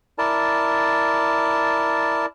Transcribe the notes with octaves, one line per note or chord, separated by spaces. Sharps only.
E4 A#4 D5 A5